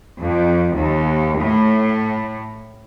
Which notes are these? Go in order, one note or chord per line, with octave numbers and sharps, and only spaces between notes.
F2
D#2
A2